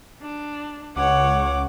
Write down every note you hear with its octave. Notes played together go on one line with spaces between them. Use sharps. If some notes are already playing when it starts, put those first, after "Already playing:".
D4
C#2 C#5 F#5 D6